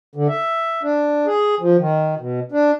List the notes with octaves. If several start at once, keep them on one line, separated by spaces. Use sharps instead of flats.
D3
E5
D4
G#4
F3
D#3
B2
D4